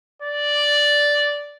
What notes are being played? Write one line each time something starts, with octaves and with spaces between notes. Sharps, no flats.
D5